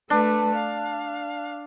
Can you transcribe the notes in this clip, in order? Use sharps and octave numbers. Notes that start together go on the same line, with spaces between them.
A3 D4 B4
F5